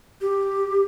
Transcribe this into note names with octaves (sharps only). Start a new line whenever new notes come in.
G4